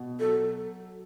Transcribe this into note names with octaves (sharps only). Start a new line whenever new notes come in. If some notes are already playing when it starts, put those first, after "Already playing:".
Already playing: B2
F#3 A4